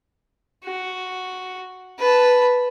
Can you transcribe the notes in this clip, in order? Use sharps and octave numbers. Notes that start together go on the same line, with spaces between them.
F#4
B4 A5